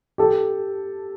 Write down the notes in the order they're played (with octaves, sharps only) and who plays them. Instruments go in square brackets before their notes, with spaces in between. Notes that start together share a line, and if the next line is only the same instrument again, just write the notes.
[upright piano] G4 A4